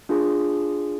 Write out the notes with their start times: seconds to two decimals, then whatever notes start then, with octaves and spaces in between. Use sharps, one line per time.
0.09 D4 F4 G#4